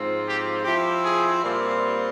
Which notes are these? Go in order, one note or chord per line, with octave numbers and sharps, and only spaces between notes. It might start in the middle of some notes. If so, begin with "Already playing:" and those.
Already playing: G#2 F3 C4 F4
G4
F3 C4 E4 G4
G#4
A#2 G3 C4 F4